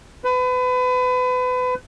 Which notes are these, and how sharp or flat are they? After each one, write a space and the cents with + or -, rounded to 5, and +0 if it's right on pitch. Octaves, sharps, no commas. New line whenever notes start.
B4 +30